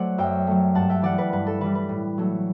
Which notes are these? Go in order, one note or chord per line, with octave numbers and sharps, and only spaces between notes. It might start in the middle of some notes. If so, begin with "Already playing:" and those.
Already playing: F#3 A3 C5 D5 F#5
F#2 E5 G5
F#3 A3
G2 F#5 A5
E5 G5
E3 G3 D5 F#5
B4 D5
G2 B4
A4
E3 G3 B4
B4
A2
F#3 A3